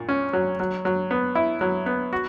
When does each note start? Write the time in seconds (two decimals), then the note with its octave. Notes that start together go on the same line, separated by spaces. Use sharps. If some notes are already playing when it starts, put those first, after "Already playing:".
Already playing: A#2
0.09 C#4
0.33 F#3
0.60 F#3
0.85 F#3
1.11 B3
1.35 E4
1.61 F#3
1.86 B3
2.13 F#4